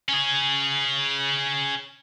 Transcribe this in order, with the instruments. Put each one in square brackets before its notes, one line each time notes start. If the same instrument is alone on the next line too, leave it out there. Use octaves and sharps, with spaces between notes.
[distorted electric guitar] C#4 G#4